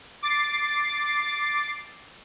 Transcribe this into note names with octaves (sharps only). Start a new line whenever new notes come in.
D6 A6 C7